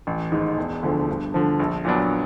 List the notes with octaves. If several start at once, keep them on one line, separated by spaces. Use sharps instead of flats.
A1
G#2 D#3
E1
D2 D3 F3
G2
D3 F3
A#1
A#2 F#3 B3 D4